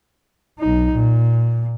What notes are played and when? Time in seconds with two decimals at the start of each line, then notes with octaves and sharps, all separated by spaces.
0.59 B1 D#4
0.95 A#2